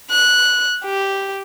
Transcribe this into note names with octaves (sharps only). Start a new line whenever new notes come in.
F#6
G4